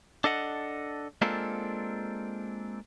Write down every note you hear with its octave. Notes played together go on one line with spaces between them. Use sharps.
D4 A4 D#5 F#5
G#3 A#3 C4 D4 F4 A4